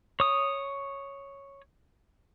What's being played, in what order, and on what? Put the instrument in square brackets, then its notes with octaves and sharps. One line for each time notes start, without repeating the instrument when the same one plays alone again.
[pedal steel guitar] C#5 D#6